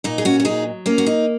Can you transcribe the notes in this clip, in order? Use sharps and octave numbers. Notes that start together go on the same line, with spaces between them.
A#2 D#4
G#4
C#4 F#4
F#4
F#3 D#4 G#4
A#3 C#4
F#4
D#4